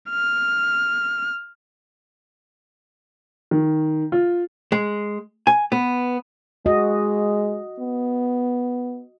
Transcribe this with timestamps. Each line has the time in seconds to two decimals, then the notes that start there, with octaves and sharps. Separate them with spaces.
0.10 F6
3.51 D#3
4.12 F4
4.72 G#3
5.47 G#5
5.72 B3
6.66 G#3 F#4 D#5
7.80 B3